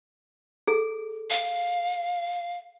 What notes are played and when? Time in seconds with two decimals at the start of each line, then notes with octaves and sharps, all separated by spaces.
0.67 G#4 A4
1.30 F5